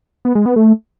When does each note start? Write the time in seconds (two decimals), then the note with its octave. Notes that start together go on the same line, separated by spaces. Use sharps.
0.25 B3
0.35 G#3
0.46 B3
0.56 A3